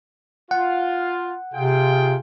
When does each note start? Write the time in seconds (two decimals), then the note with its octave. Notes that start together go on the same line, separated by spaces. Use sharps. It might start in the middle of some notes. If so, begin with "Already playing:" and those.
0.51 F4 F#5
1.54 C3 F4 G#4 G5